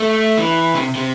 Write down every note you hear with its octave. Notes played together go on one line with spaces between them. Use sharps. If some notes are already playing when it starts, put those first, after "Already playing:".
Already playing: A3
E3
C3
C3